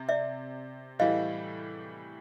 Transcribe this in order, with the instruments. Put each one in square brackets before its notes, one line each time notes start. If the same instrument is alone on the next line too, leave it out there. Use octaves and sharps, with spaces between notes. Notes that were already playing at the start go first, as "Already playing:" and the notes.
Already playing: [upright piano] C3
[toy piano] D5 E5
[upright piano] A2 E3 G3 [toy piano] D#5 F5